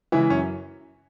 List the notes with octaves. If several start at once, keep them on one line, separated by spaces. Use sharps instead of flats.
C#3 E3 G#3 E4
F#2 C#4